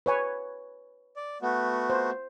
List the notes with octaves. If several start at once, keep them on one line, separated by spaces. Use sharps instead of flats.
B4 C#5 G#5
D5
A3 B3 F#4
C5